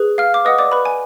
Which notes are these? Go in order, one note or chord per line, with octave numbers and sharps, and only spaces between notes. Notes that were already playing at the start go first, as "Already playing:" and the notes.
Already playing: G#4 B4
F5 F6
D6
B4 D#5 F#5 D#6
D5 D6
B4 B5
G#5